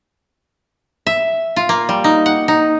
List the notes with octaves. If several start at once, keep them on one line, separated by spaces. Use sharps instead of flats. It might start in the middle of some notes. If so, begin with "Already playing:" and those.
E5
F4
A#3
G3
D#4
F#5
D#4